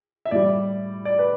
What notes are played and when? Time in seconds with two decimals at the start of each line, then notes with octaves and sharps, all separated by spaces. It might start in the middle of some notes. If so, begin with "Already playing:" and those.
0.25 E5
0.31 A2 G3 D5
1.05 D5
1.19 B4